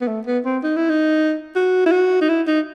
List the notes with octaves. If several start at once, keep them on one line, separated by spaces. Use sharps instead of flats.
B3
A3
B3
C4
D#4
E4
D#4
F#4
E4
F#4
D#4
E4
D#4